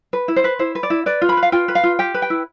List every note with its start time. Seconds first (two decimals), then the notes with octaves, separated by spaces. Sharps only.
0.13 B4
0.28 E4
0.36 C5
0.44 B4
0.59 E4 C5
0.75 B4
0.83 D5
0.90 E4
1.06 B4 D5
1.22 F4
1.29 B5
1.37 B4
1.43 F5
1.52 F4 G5
1.68 B4
1.75 F5
1.83 F4
1.99 G4 G5
2.14 B4
2.22 G5
2.30 E4